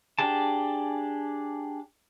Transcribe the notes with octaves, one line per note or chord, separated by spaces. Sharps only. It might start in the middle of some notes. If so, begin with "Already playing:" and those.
D4 G4 G#4 A5